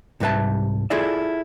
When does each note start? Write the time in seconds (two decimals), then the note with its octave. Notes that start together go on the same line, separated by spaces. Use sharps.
0.20 C2 G#2 G3 B4 E5 A5
0.90 E4 F4 G#4 A4 D5 E5